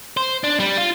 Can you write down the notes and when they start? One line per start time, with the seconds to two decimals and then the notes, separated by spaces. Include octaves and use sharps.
0.17 C5
0.44 D4
0.60 G3
0.78 F4